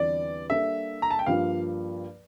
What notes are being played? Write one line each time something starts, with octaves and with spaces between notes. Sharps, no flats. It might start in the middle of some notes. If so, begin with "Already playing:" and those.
Already playing: E2 D3 G3 C4 F4 D5
G3 A#3 D4 A4 E5
A#5
A5
G5
G2 F3 A#3 F4 F5